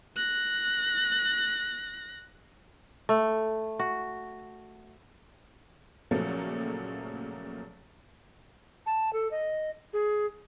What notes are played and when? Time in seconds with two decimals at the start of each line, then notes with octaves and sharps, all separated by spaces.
0.16 F#6 A#6
3.09 A3
3.80 F#4
6.11 A#2 C#3 F3 F#3 A3 A#3
8.86 A5
9.13 A4
9.31 D#5
9.93 G#4